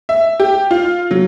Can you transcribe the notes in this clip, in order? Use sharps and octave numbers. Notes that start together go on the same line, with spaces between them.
E5
G4
F4
F#3